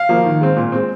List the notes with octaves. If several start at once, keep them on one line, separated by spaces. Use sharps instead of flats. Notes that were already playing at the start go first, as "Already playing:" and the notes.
Already playing: F5
F3 A#3
D#3
G#3 C4
A#2
G#3 C4